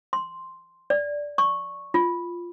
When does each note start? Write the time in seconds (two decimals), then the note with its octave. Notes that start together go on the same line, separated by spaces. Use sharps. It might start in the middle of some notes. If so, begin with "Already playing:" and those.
0.13 C6
0.90 D5
1.38 C#6
1.94 F4